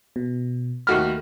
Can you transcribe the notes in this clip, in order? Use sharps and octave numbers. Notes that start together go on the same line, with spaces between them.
B2
D#2 A3 F#4 B5 F6